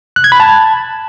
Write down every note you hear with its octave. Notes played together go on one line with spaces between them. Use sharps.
F#6
G#6
B5
A5